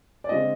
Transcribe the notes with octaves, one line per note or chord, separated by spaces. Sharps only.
D5
D3 G#3 C4 F4 D#5